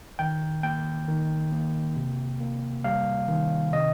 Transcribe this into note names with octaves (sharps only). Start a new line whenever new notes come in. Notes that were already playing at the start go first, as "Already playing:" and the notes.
D#3 G5
A#3 G5
D#3
A#3
C3
A#3
G3 F5
D#3
C3 D#5